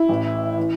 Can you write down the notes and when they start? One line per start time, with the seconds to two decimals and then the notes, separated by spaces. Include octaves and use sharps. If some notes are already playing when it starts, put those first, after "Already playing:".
Already playing: E4
0.09 A1 A2 E3
0.57 E3